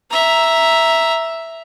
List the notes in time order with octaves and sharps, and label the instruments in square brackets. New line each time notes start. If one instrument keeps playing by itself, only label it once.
[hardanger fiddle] E5 A#5